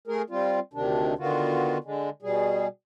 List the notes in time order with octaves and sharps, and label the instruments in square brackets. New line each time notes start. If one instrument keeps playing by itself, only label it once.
[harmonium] A3 G#4 A#4
G3 C4 F4
D2 C3 D#3 D4
D3 D#3 B3 F4 F#4
D3 G#3
B2 G3 G#4